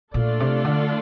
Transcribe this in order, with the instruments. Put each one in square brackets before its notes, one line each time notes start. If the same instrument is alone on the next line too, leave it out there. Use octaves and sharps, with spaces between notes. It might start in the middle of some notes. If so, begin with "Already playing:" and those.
[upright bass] A#2 [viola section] A3 D4 F4 A4 D5
[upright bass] C3
D3